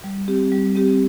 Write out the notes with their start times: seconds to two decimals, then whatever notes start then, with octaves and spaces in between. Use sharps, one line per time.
0.04 G3
0.28 C4 G4
0.52 G3
0.76 C4 G4